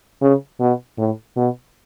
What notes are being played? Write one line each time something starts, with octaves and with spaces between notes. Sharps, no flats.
C#3
B2
A2
B2